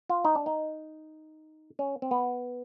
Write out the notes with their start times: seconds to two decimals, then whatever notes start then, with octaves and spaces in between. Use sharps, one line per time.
0.10 F4
0.25 D#4
0.35 D4
0.46 D#4
1.79 C#4
2.02 C4
2.11 B3